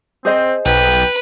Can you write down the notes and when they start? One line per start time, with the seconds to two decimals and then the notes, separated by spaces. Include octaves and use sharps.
0.25 C4 G#4 C5 D#5
0.66 B1 B4 G5